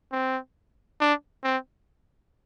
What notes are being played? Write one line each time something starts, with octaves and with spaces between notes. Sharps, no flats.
C4
D4
C4